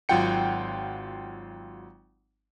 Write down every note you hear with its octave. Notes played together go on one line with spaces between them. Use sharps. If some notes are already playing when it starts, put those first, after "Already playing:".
G#1 F#3 F4 F#5 G5 C#7